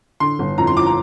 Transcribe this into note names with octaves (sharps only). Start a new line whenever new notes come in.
D3 C6
G1
F2 A#5
C6
F3 D6
A#5